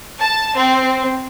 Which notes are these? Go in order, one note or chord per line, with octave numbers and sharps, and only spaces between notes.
A5
C4